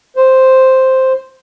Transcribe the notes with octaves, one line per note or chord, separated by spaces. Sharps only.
C5